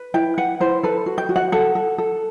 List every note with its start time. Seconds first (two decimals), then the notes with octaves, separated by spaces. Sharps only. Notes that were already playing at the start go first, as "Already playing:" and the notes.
Already playing: B4
0.14 E4 G5
0.38 B4 F#5
0.60 E4 C5
0.83 A4 B4
1.06 F#4
1.18 G5
1.29 F#4
1.36 F#5
1.52 A4 F#5
1.75 A4
1.98 A4